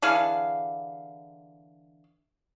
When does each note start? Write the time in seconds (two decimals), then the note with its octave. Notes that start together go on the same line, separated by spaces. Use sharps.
0.02 D3 E3 G#4 F5